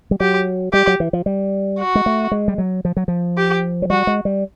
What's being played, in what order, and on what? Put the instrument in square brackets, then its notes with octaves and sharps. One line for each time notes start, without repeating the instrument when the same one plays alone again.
[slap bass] G3
[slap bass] F#3 [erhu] G4
[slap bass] G3 [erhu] G4
[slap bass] F#3
E3
F3
G3
[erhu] F#4
[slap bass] G#3
A3
G#3
G3
F#3
F3
F#3
F3
[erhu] G4
[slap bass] F#3
[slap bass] G3 [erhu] F#4
[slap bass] G#3
G3